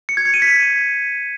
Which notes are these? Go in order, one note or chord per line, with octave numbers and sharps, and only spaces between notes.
C#7
G#6
C#7
D#7
B6